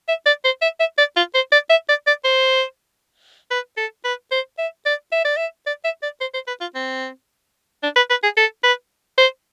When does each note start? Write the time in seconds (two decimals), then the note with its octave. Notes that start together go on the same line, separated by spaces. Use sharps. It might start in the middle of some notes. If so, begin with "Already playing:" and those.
0.08 E5
0.26 D5
0.44 C5
0.62 E5
0.80 E5
0.98 D5
1.17 F4
1.35 C5
1.52 D5
1.70 E5
1.89 D5
2.07 D5
2.24 C5
3.51 B4
3.77 A4
4.05 B4
4.31 C5
4.58 E5
4.86 D5
5.12 E5
5.25 D5
5.37 E5
5.67 D5
5.84 E5
6.03 D5
6.21 C5
6.34 C5
6.47 B4
6.61 F4
6.75 C4
7.83 D4
7.96 B4
8.10 B4
8.23 G#4
8.37 A4
8.64 B4
9.18 C5